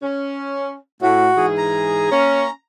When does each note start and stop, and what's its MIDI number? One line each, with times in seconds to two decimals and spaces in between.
0.02 0.77 61
1.02 1.29 45
1.02 1.46 66
1.37 2.08 44
1.37 2.08 52
1.37 2.08 68
1.58 2.50 82
2.12 2.46 58
2.12 2.46 61